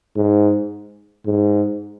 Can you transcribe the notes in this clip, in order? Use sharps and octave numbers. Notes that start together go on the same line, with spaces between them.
G#2
G#2